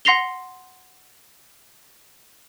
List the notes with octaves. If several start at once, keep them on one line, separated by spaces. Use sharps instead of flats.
F#5 C6 A#6 C7 F7 G7